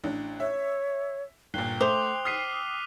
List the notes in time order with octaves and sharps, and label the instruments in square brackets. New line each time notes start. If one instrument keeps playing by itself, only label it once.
[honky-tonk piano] A1 D4
[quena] C#5 [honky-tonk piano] E5
[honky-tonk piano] G1 A#2 [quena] G5 [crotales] F#6 C7 G7
[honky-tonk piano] A3 [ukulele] C5 [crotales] D6 D#6 F7
[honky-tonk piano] D#6 C7 [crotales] F6 B6 D#7